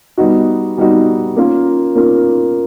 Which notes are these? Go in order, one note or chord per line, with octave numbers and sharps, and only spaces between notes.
G3 B3 D#4 F#4
G3 B3 D#4 F#4
A#3 C#4 F4 A#4
A#3 C#4 F4 A#4